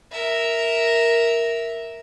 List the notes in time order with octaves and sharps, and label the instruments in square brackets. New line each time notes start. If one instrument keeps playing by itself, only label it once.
[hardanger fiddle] A#4 E5